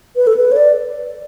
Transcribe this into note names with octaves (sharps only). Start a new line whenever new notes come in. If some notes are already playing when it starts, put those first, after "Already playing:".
B4
A4
B4
C#5
D5